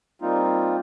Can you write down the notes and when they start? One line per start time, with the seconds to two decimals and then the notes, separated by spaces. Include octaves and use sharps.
0.22 G3 A#3 C4 D#4 F4